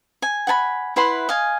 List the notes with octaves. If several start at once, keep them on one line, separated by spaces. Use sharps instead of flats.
G#5
F#5 G#5 A5 B5
E4 B4 F#5 C6
D#5 F5 G#5